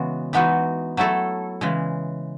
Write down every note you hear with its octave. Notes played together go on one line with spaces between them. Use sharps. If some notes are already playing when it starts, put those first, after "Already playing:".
Already playing: C#3 E3 G#3 B3 F#4
E3 G#3 B3 D#4 F#4
F#3 A3 E4 A4
C#3 E3 G#3